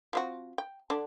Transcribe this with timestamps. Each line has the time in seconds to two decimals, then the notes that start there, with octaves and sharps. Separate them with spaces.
0.13 F3 C4 F#4
0.58 G5
0.90 D3 D4